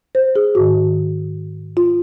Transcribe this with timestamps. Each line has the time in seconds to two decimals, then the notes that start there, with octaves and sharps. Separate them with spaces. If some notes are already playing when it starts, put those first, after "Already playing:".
0.15 C5
0.36 G#4
0.55 G#2 D#3 F#4
1.77 F4